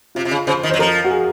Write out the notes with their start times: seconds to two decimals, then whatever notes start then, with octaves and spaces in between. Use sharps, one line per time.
0.15 C3 F4
0.25 C3
0.31 C#3
0.47 C#3 C5
0.63 D#3
0.70 F#3 C5
0.79 F3 A#4
1.04 F#4
1.11 G#4